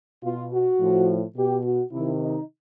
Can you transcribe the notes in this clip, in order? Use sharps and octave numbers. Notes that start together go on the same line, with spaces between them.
B2 F4
F#4
A2 F3
B2 G4
F#4
C3 D#3 E4
D#4